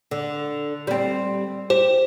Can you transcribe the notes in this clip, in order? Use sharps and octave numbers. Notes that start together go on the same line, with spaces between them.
D3
G3 C4
G4 C5